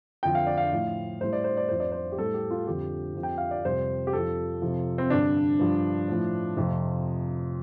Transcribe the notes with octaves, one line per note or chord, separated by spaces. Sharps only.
F2 D3 F3 G5
F5
D5
F5
A2 F3
A2 G3 C5
D5
C5
D5
F2 F3 C5
D5
C5
G4
A2 G3 A4
G4
F4
F2 D3 F3 G4
F2 F3
G5
F5
D5
F2 C3 G3 C5
G4
F2 F3 A4
F2 C3 F3
C4
G2 D3 G3 D4
G2 F3
A2 F3
F2 C3 F3